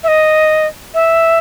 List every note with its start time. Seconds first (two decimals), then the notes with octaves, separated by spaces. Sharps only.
0.04 E5
0.08 D#5
0.94 E5